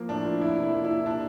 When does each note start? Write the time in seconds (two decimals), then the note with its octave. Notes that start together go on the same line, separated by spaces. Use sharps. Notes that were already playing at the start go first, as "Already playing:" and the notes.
Already playing: F3 A#3
0.09 A2 D4
0.25 F3
0.41 A#3 E4
0.58 C3
0.64 E4
0.74 A#3
0.85 E4
0.90 A#3
1.06 A#2 D4